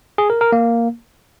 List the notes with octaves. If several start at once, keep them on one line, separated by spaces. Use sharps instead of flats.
G#4
A#4
A#4
A#3